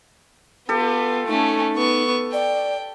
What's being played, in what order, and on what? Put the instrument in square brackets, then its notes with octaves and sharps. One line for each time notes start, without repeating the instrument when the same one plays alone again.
[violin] B3 F4 [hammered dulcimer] G4 A4
[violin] A3 C#4 [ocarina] D#4
[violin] B3 C#6
[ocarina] D5 [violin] G5